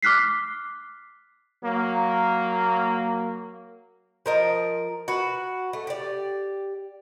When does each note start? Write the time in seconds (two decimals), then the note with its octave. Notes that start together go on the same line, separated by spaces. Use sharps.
0.03 D6 F6 F#6 B6 C7
1.63 F#3 A#3
4.26 F3 A#4 D#5
5.08 F#4 B4
5.73 A3
5.87 G4 D5